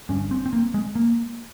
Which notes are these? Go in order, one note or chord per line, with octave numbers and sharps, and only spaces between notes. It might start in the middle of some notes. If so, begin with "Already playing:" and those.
G1 G2 C#4
C4
C4
A#3
G#3
A#3